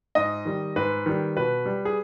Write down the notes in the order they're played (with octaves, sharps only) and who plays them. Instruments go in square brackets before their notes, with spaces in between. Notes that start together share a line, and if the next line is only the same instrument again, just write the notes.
[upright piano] G#2 D#5
D#3 G3
G#2 B4
D#3 G3
B2 B4
G3
G#4